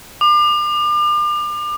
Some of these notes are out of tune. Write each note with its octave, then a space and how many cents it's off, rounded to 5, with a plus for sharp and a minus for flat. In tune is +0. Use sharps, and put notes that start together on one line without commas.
D6 +35